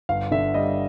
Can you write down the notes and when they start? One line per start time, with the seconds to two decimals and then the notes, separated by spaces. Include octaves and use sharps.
0.09 G1 F5
0.31 D3 E5
0.54 G3 D#5